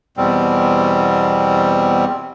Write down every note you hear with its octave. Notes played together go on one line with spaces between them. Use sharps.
E2 B2 G3 C4